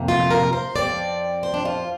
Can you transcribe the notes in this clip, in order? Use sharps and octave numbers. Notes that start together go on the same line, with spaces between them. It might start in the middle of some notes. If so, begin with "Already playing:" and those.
Already playing: F2 C3 A#3
F4
A#4
C5
F2 F3 C4 D5
C5
D4
F4